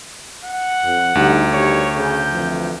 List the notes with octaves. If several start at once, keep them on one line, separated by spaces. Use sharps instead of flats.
F#5
F2
D2 G3 D#4 G4
D#3 G3 C#5
C#3 G6
F2 E3 F3